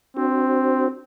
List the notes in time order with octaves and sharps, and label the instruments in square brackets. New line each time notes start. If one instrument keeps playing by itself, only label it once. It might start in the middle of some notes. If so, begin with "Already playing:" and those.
[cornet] C4 [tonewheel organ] D4 F#4 C5